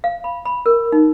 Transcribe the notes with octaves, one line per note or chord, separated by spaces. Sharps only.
F5
B5
B5
A#4
D#4